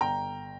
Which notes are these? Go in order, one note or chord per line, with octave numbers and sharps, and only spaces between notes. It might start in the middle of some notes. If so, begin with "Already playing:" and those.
G1 G5 A#5